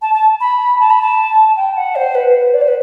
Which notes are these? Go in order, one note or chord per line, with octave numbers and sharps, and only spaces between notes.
A5
A5
B5
A5
B5
A5
G5
F#5
C5
B4
C5
D5
C5
B4